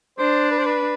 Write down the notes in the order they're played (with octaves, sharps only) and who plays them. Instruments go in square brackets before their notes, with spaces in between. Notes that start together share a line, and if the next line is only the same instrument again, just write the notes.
[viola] D4 [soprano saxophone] C5
[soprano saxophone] B4
C5
B4